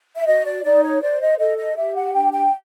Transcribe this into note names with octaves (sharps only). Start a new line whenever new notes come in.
E5
F#4 D#5
D5
D#4 D5
C#5
C5 D5
D#5
A4 D#5
D#5
G4 E5
F#5
D4 G5
G5